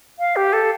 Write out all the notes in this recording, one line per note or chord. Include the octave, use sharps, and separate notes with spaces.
F5
G4
A4